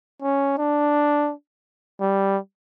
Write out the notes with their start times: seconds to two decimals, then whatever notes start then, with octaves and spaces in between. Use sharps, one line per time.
0.22 C#4
0.58 D4
2.01 G3